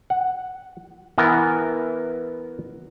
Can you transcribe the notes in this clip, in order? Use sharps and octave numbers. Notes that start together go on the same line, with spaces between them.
F#5
E3 B3 A#4